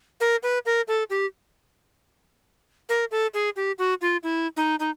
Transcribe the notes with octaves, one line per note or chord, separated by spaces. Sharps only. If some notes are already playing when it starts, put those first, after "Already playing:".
A#4
B4
A#4
A4
G4
A#4
A4
G#4
G4
F#4
F4
E4
D#4
D#4